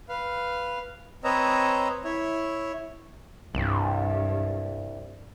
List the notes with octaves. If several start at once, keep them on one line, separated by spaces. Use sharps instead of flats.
B4 F5
C4 B4 C#5 D#5 A#5 E6
E4 C#5 E5
C2 G2